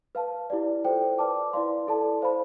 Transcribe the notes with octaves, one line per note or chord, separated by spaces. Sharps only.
B4 F5 A5
E4 G4 D5
F4 A4 C5 G5
B4 D5 A5 D6
E4 B4 D5 F5 C6
E4 A4 D5 A5
C5 F5 B5